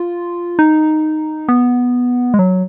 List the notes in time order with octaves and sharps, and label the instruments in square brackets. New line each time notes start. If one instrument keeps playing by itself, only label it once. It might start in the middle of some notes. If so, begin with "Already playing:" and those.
Already playing: [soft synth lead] F4
D#4
B3
G#3
F#3